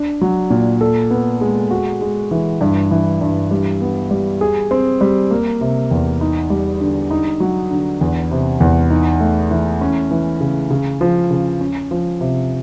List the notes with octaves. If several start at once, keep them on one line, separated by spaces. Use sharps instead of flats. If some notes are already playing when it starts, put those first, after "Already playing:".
Already playing: D4
F#3
A#2
A4
B3
G#3
F#4
G#3
E3
G2
E3
G2
G3
B3
G3
G#4
C4
G3
A#3
C3
E2
D#4
G3
D3
D#4
F#3
D3
E2
C3
E2
D#4
A3
E3
C#4
E3
C#3
C#3
F3
C#3
C#4
F3
C3